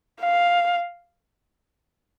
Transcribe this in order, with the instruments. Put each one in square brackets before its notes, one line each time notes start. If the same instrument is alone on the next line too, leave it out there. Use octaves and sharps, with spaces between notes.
[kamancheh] F5